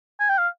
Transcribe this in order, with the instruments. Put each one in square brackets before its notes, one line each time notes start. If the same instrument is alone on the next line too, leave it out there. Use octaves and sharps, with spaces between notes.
[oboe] G#5
G5
F5